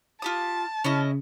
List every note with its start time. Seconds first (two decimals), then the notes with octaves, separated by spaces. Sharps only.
0.22 F4 G4 A5 D#6
0.84 C#3 C#4 E4 D#5